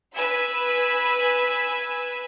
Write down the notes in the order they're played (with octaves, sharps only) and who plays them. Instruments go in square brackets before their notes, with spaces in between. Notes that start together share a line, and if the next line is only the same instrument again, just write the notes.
[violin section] B4 G#5 B5 E6